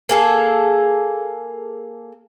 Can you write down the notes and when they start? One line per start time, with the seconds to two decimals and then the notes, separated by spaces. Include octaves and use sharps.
0.09 A#3 G#4 A4